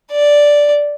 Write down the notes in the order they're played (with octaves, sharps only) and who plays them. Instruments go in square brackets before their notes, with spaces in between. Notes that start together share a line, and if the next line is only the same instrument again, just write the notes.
[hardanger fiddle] D5